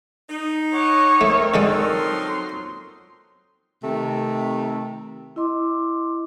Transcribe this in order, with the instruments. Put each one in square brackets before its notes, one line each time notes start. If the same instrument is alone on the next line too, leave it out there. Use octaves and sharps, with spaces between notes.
[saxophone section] D#4
[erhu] C#5 [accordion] F#5 D6
[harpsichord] A3 [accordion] C4 A4 A#4
[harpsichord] D3 G#3 D5 [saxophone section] F3 F#3 D#4
[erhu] C6
[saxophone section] C3 D#3 A3
[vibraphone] E4 D#5 C6 D6